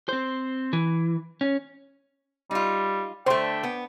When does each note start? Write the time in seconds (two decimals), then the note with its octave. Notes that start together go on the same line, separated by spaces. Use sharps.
0.09 C4 C5
0.73 E3
1.41 C#4
2.51 G3 D#4 F4
3.26 D3 A3 C5 G5 C6
3.63 B3